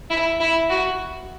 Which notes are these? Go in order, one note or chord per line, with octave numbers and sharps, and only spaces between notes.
E4
E4
F#4